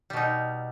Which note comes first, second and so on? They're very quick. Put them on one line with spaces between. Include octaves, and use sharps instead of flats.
G3 B2 D#4